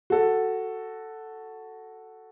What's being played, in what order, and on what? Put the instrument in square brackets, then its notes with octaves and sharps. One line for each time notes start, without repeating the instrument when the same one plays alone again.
[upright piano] F#4 A4